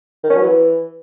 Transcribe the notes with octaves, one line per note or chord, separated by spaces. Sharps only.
D#3
C#4
F#3
E3